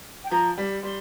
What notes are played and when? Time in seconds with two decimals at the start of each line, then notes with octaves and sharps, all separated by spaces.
0.24 G5
0.31 F3 A#5
0.58 G3
0.83 G3 C6